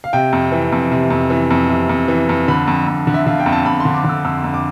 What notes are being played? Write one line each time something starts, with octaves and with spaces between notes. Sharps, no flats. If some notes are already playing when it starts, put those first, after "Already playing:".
F5
C3 G5
F2
E3
F2
C3
F2
E3
F2
C3
F2
E3
F2
D3 B5
F2
F2
D3
E5
D3 F5
G5
F2
A5
F2 B5
D3 C6
D6
D3 E6
F2 E6
F2
D6